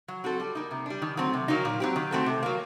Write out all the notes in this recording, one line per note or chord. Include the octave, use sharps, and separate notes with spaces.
F#3
C4 F#4 A4
G3
A#3 D#4
C3
G3 D4
D#3
F#3 A3 C4
C3
D#3 F#3 A#3 D#4
A#2
F#3 C4 G4
D#3
A3 C4 F#4 A4
C3
F#3 A#3